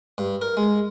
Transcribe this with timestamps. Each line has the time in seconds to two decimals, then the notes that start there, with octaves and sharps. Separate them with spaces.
0.18 G2
0.41 A#4
0.57 G#3